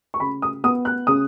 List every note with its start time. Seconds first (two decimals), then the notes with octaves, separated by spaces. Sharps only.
0.14 C#6
0.20 C#3 B5
0.42 D#6
0.64 B3 D#6
0.85 F#6
1.07 C#3 D#6